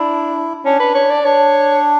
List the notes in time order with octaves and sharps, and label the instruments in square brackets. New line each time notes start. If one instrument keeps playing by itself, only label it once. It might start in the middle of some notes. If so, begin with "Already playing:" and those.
Already playing: [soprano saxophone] D4 [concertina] E4
[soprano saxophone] C#4 [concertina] D4
[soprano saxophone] B4
C#5
D5
[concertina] D4 [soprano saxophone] C#5